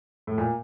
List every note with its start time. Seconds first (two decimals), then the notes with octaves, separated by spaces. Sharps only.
0.27 A2
0.38 A#2